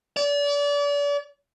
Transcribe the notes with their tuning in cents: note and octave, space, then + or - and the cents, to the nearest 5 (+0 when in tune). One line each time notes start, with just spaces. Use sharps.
D5 -35